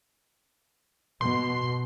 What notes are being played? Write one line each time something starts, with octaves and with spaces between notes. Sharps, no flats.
B2 C6